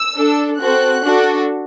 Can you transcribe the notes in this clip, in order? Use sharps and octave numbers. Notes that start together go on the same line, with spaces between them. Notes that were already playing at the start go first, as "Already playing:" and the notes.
Already playing: E6
D4 A4
C4 F#4 A4 F#6
D4 F#4 A4